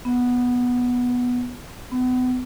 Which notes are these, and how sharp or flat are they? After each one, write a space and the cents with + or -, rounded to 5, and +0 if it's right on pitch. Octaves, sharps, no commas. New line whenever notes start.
B3 -5
B3 +35